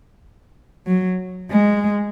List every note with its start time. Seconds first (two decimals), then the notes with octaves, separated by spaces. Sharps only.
0.87 F#3
1.51 G#3